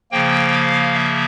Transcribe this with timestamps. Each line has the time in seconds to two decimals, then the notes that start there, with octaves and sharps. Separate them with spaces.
0.12 C#3 F3 A#3 G5
0.53 F5
0.94 E5